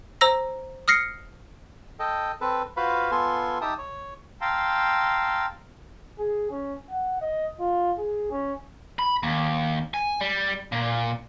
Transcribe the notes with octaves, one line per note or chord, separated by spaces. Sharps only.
C5 A#5 E6 A#6
D#6 F6 A#6 C7 C#7
A4 D#5 G5
C4 A4 B4
F4 F#4 B4 C5 F5 B5
B3 F4 A4 G#5 C6
D#4 G4 E5 G5 A5 D#6
C#5
F5 G5 A5 A#5 C6 E6
G#4
C#4
F#5
D#5
F4
G#4
C#4
B5
D#2
G#5
G3
A#2